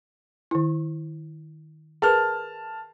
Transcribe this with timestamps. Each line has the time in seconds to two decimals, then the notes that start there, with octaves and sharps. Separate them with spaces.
0.51 D#3 E4
2.02 G#4 A#4 B4 A5 F6